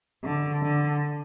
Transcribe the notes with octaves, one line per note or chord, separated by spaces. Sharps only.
D3
D3